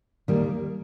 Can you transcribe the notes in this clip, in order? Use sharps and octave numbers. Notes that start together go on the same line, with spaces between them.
D#2 D#3 G3 A#3